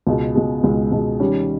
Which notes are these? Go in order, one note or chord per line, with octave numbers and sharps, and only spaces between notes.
C#2 B2 G#3
C#2 B2 G#3
C#2 B2 G#3
C#2 B2 G#3
D#3 G3 C#4 G4